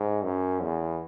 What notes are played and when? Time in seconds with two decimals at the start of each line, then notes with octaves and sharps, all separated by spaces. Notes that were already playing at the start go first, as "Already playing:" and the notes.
Already playing: G#2
0.23 F#2
0.62 E2